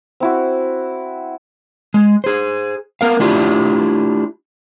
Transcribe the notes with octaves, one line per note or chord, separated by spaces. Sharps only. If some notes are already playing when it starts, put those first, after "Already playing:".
C4 E4 F#4
G#3
G#4 C5
B3 A#4 F5
A3 D4 E4 F4 G4 E5